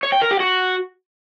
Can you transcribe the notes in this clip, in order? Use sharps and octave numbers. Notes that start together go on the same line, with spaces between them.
C#5
G5
A#4
G4
F#4